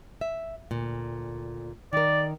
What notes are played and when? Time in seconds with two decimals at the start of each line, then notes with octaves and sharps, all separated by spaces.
0.21 E5
0.71 D2 A#2
1.93 D#3 A#4 D5